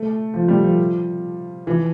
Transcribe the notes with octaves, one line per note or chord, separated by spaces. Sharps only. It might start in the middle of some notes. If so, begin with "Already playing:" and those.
Already playing: A3
F3
G3
F3
E3